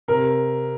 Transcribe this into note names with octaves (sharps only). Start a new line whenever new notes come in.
C3 A#4